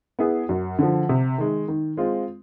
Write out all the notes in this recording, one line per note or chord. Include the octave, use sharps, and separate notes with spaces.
B3 E4 G#4
F#2
D3 F3
C3
D#3 G#3
D#3
G#3 C4 F4